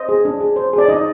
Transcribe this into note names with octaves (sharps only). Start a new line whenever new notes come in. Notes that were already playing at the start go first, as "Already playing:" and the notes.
Already playing: C5 D#5
G#4
D4
G#4
C5
G#4
D5
D#4 D#5